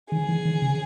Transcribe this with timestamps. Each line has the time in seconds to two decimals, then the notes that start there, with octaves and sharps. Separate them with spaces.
0.12 D#3 G#4
0.29 E3
0.45 D#3
0.62 C#3